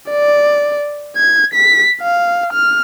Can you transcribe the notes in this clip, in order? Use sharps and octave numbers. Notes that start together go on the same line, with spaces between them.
D5
G#6
B6
F5
F6